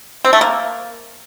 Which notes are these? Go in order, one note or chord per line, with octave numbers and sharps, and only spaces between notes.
C4
A3
A#3